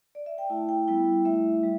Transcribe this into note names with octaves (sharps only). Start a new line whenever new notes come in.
D5
E5
G5
A3 E4 A5
G5
G3 B3 E4
A3 E4 E5
G3